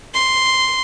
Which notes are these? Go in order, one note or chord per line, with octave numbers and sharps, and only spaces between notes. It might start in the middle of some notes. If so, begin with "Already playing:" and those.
C6